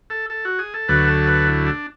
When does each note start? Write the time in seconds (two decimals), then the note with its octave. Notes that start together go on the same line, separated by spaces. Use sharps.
0.10 A4
0.30 A4
0.45 F#4
0.59 G#4
0.74 A4
0.88 D2 D3 F#3 A3 B4
1.07 A4
1.27 B4
1.47 E4
1.66 D4